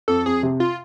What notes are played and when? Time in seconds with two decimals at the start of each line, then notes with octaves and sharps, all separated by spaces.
0.08 F2 A4
0.26 F2 G#4
0.43 C3
0.60 F4